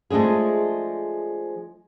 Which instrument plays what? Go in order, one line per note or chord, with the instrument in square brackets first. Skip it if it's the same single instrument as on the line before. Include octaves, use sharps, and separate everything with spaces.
[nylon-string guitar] F3 G#3 A3 D4 G#4